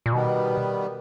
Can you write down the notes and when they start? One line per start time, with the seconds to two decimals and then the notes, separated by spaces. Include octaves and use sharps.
0.06 A#2
0.12 B2 D#3 G3 B3